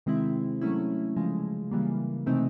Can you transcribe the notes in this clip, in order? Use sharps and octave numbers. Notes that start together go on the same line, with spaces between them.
C3 D#3 G#3 C4 E4
F#3 A3 C#4 E4
C#3 F3 G#3
C#3 E3 G3 A#3
C3 E3 A3 C4 D#4